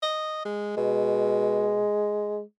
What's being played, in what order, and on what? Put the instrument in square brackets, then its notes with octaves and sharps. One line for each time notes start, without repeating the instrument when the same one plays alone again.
[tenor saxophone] D#5
G#3
[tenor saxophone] B2 [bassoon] G#3